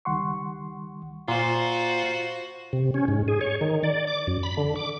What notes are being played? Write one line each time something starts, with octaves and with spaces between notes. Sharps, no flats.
C#2 D#3 G3 F#5 C6 C#6
A#2 F4 F#4 C5
C3
C#4
G#2
G#4
C#5
D#3
D5
D6
F#2
B5
D3
D6